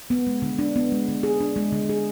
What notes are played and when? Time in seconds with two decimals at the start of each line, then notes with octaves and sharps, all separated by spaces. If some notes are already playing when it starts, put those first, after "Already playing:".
0.10 B3
0.27 G#3
0.42 D3
0.59 D4
0.76 B3
0.92 G#3
1.08 D3
1.23 G#4
1.40 D4
1.56 G#3
1.72 D3
1.89 G#4